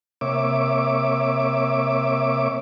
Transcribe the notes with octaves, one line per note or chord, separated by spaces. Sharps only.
C3 A#3 C#5 E5 D6